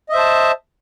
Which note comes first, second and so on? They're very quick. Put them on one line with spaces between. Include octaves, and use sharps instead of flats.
D#5 E5 C5 A5